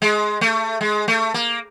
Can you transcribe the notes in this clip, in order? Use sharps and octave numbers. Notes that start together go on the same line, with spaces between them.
G#3
A3
G#3
A3
A#3